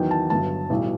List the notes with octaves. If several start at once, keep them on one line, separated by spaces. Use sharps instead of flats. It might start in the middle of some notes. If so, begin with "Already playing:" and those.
Already playing: E2 D#3 F#3 G5
A5
G1 G2 F#3 A5
B1 A2 E3 G3